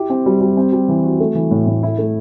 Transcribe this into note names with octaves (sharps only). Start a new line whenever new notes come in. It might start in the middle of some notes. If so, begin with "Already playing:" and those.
Already playing: E4 G4
C4
G3
G3
C4
G3
E3
F#4
A3
E3
A2
A2
E4
A3